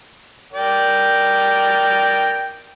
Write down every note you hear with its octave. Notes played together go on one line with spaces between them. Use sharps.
A#4 D5 G5